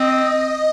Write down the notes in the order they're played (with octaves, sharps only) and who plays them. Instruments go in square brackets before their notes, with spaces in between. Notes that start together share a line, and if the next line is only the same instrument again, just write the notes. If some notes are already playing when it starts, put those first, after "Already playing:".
Already playing: [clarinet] C4 [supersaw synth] D#5